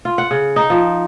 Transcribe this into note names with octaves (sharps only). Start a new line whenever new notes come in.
F4
F#5
C#3
D#4
F3